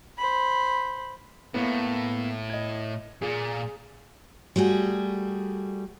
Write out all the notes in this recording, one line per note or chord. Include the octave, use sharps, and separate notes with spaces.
C5 B5
A2 A#3 B3
D#5 G#6
A#2 G#4
G3 A3 F#4 G#4